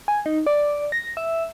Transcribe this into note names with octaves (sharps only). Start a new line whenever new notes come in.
G#5
D#4
D5
A#6
E5